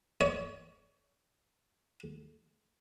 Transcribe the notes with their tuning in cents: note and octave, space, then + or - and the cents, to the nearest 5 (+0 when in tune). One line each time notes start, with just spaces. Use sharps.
C#5 +30